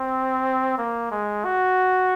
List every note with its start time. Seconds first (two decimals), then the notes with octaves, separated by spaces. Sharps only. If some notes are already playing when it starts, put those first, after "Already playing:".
Already playing: C4
0.78 A#3
1.11 G#3
1.45 F#4